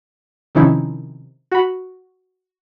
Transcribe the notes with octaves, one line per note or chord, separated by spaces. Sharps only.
C3 D#3 F3 C#4 D#4 E4
F#4 B5